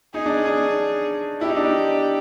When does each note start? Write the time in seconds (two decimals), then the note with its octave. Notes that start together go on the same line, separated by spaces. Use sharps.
0.14 D#4 G#4
0.26 D4
0.36 C#4
0.47 D4
1.41 E4 G4
1.49 D#4
1.56 D4
1.64 D#4